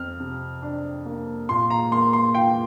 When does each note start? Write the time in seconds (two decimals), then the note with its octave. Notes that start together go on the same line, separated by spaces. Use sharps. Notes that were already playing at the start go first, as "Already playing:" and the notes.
Already playing: F2 F6
0.20 C3
0.62 D4
1.06 A#3
1.49 A#2 C6
1.70 A#5
1.92 A#3 C6
2.13 C6
2.35 F4 G5